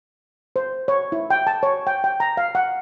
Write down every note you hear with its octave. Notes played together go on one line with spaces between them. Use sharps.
C5
C#5
E4
G5
A5
C#5
G5
G5
A#5
F5
F#5